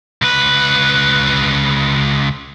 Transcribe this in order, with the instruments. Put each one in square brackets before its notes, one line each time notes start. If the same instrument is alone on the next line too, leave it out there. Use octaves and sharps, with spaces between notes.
[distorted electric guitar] C#2 B4